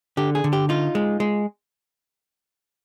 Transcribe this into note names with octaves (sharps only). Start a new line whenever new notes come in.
D3 G4
G#4
D3
G4
D#4 F4
G#3
G#3